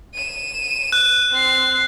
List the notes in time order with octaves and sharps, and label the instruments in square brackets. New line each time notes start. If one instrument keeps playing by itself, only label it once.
[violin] D#7 E7
[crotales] F#6
[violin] C4 C7